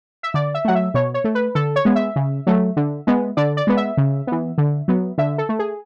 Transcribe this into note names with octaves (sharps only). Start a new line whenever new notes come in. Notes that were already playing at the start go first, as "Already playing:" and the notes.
E5
D3 D5
E5
F#3 A3 F#5
E5
B2 C#5
C#5
A3
B4
D3 A4
C#5
G#3 B3
E5
C#3
F#3 A3
D3
G#3 B3
D3 D5
D5
G#3 B3
E5
C#3
E3 B3
D3
F#3 B3
D3 E5
A4
A3
G#4